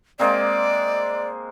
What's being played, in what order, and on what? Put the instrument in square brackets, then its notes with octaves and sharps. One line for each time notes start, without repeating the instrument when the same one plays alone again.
[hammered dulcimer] G#3 A#3 C4 [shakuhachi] D5